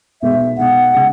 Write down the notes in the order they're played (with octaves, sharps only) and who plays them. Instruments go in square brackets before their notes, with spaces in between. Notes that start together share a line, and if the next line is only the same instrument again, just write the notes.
[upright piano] B1 B2 G#3 B3 [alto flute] E5
[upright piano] B1 B2 G#3 B3 [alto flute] F#5
[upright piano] C#3 G#3